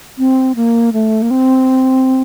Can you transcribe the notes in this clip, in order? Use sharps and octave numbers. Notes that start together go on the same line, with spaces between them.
C4
A#3
A3
A#3
C4